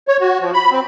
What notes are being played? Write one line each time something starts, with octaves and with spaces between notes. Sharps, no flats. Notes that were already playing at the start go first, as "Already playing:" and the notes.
C#5
F#4
F3
B5
C4